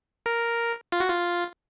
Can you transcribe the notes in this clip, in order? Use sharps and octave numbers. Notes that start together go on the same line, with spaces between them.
A#4
F4
F#4
F4